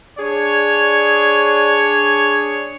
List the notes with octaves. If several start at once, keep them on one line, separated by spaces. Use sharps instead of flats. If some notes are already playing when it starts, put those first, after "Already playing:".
D4 G#4 C#5